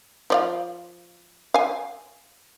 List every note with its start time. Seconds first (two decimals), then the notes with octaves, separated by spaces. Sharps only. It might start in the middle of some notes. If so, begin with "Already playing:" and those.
0.30 F3 D5 F5
1.54 F5 G#5